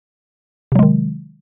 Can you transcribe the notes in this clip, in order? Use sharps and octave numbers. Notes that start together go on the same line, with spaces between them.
C3 D#3 F#3 G#3